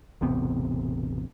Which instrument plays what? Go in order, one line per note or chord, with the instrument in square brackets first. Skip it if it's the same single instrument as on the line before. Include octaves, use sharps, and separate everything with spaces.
[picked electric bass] E1 A1 C3 B3